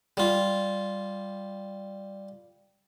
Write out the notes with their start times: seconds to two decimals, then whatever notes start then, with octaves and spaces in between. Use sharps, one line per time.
0.17 G3 F4